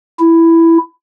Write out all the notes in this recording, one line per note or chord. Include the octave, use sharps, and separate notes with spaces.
E4